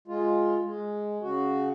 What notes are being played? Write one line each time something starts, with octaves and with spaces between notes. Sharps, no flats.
G#3 F4
G#3
C#3 F#4